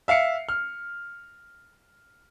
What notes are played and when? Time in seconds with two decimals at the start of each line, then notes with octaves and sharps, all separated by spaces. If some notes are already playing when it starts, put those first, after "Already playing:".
0.08 E5 F5 C7 C#7
0.49 F6